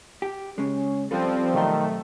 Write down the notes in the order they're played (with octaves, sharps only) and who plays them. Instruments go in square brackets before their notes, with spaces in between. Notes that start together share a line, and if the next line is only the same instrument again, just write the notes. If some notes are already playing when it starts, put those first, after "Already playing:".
[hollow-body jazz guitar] G4
[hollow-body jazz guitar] C#3 G#3 [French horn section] C#4
[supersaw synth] F3 C4 [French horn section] G3 [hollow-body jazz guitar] A4 B4
[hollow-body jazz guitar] B2 F#3 C6 [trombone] D#3 [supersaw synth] A3